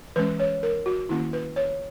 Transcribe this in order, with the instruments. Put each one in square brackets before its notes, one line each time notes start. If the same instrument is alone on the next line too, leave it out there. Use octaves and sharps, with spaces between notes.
[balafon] E3 G#3 C#4 B4
C#5
A#4
F#4
D#3 A#3 C#4 E4
B4
C#5